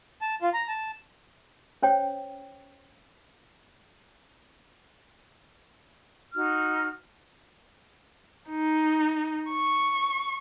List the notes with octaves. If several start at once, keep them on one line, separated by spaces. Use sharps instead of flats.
A5
F4
A#5
A5
C#4 C5 C#5 G5
D#4 F#4 F6
D#4
C#6